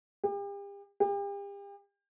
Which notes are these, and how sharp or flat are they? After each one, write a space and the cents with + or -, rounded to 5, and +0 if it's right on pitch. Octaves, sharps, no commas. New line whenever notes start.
G4 +40
G4 +40